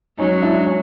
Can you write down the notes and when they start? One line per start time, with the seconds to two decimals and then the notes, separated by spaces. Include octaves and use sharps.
0.18 F#3 G#3 C#4 D#4
0.42 D4 E4
0.66 C#4